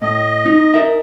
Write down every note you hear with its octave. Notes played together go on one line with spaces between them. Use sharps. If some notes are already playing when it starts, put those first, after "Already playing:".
A2 D#5
D#4
A#4 E5